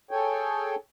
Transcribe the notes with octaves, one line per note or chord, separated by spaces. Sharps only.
G#4 A4 C#5 G5 G#5